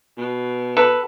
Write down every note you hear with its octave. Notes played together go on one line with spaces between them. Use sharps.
B2
A4 B4